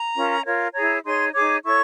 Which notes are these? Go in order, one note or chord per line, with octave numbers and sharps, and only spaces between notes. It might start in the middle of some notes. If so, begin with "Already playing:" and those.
Already playing: A#5
C#4 F4 A#4
F4 A#4 C#5
E4 G#4 C#5 A#5
D#4 G#4 C#5 C6
D#4 G#4 C#5 D6
E4 A4 C#5 C#6